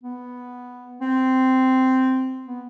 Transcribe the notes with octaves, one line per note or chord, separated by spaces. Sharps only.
B3
C4
B3